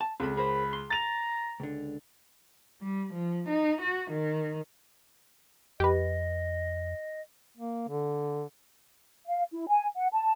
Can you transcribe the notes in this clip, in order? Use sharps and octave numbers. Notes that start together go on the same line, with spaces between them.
A5
C#2 C4 A4 B5
G#4 A#4 C5 B5
C6
A#5 A6 F7
C#2 D3
G3
F3
D#4
F#4
D#3
F2 G4 B4 D#5
A#3
D3
F5
E4
G#5
F#5
A5